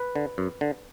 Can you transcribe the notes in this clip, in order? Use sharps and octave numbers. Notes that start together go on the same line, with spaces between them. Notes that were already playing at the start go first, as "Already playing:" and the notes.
Already playing: B4
D3
F#2
D3